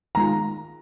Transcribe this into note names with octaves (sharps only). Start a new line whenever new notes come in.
D#3 G#3 F4 A#5